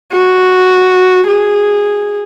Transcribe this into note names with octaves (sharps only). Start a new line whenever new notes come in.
F#4
G#4